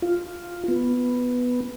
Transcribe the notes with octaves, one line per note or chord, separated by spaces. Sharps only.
F4
B3